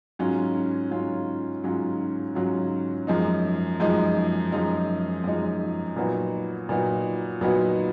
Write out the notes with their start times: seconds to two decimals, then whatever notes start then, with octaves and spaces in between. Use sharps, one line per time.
0.19 G#2 F#3 C#4 F4
0.91 G#2 F#3 C#4 F4
1.64 G#2 F#3 C#4 F4
2.35 G#2 F#3 C#4 F4
3.07 F#2 F3 G#3 D#4
3.80 F#2 F3 G#3 D#4
4.52 F#2 F3 G#3 D#4
5.24 F#2 F3 G#3 D#4
5.96 A#2 F#3 B3 D#4 F#4
6.69 A#2 F#3 B3 D#4 F#4
7.41 A#2 F#3 B3 D#4 F#4